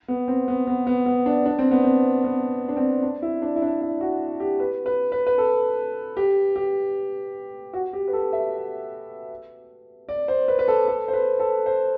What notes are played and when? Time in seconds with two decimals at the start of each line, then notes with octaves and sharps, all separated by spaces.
0.08 B3
0.28 C4
0.48 B3
0.67 B3
0.87 B3
1.06 B3
1.26 D4
1.46 D4
1.59 C4
1.71 B3
1.84 C4
2.24 B3
2.69 D4
2.77 C4
3.03 D4
3.22 E4
3.42 D4
3.56 E4
3.62 D4
3.81 E4
4.01 F#4
4.40 G4
4.60 B4
4.86 B4
5.12 B4
5.27 B4
5.38 A4
6.17 G4
6.56 G4
7.73 F#4
7.93 G4
8.08 B4
8.13 A4
8.33 E5
10.09 D5
10.28 C5
10.48 B4
10.59 B4
10.68 A4
10.88 A4
11.08 C5
11.13 B4
11.40 A4
11.66 C5